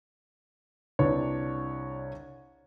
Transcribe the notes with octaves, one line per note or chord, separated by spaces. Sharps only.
C2 C3 D4 B4 C#5